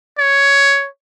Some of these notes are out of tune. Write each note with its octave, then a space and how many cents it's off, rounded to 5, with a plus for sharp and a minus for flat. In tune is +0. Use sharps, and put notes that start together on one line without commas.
C#5 +10